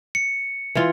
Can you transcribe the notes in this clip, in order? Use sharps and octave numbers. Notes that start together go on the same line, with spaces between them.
C#7
E3 F4